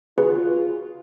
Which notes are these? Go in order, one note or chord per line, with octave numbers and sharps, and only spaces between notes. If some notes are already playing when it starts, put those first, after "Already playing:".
F4 F#4 G#4 B4